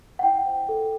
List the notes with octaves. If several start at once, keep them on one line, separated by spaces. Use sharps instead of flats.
F#5
E4 G5
C5
A4